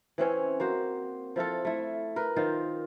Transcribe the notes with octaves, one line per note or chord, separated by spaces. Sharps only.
E3 C4 C#4 C#5
A#3 F#4 C5
F3 E4 F4 A4
A3 E4
A#4 B4
D#3 F4 C5